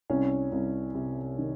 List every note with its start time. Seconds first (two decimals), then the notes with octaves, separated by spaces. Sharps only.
0.10 C2 C#4
0.52 C2
0.95 C3
1.38 D#3